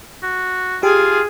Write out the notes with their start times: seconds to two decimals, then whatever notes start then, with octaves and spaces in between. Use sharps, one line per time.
0.23 F#4
0.83 F4 G4 G#4